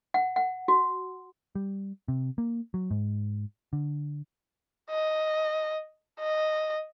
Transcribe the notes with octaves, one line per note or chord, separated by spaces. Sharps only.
F#5
F#5
F#4
G3
C3
A#3
F#3
G#2
D3
D#5
D#5